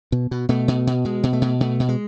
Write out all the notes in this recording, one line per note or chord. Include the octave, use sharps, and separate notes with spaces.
B2
B2
B2 A3
B2
B2
B2 G#3
B2
A3
B2
B2 A3
B2
G#3